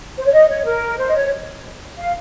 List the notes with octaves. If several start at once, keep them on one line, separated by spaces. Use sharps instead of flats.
C5
C#5
D#5
C#5
A#4
C5
D#5
C#5
F5